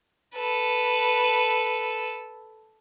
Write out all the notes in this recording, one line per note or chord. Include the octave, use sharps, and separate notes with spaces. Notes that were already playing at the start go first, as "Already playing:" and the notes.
A4 B4